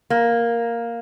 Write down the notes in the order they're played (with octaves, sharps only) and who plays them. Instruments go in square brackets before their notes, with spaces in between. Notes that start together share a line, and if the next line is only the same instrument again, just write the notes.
[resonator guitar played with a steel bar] A#3